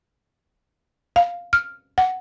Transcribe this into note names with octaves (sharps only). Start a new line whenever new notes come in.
F5
F6
F#5